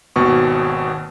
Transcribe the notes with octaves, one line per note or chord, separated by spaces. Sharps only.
G#1 D#2 B2 C#6